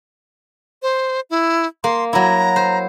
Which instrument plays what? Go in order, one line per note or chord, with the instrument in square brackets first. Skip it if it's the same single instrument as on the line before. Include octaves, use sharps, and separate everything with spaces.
[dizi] C5
E4
[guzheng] A#3 [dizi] C6
[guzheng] F#3 E4 [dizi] A#5
[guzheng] C5